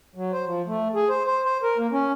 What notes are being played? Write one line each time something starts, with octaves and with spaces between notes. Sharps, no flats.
F#3
C5
F3
A3
G#4
C5
C5
C5
A#4
A#3
C#4